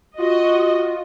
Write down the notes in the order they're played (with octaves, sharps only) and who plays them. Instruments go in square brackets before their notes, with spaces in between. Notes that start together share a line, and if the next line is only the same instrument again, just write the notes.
[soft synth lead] F4 [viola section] F#4 D#5